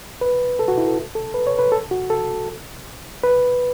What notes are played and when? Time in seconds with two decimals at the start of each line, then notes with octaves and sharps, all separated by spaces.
0.21 B4
0.59 A4
0.68 F#4
0.78 E4
0.88 A4
1.15 A4
1.34 B4
1.47 C#5
1.59 B4
1.72 A4
1.91 F#4
2.10 A4
3.23 B4